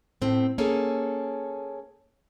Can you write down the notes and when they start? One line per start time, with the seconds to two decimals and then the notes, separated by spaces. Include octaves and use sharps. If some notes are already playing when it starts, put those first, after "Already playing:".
0.22 A2 A3 C4
0.58 A#3 C#4 G#4 A4